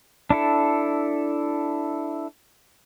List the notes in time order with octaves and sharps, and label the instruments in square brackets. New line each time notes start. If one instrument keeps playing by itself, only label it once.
[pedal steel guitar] D4 E4 A4